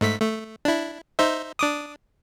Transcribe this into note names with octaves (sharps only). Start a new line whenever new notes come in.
G#2 A3 B6
A3
D4 E4
D#4 C5 E5
D4 D6 D#6